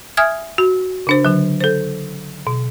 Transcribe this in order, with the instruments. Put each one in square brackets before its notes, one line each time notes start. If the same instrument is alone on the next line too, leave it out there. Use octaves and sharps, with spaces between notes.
[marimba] E5 G#5 D#6 F6 G#6
F#4
C#3 D4 C5
D3 F#3
A4 C5
B2